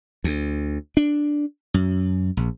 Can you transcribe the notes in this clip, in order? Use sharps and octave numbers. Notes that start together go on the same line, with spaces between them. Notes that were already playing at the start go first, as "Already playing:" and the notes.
D2
D4
F#2
A#1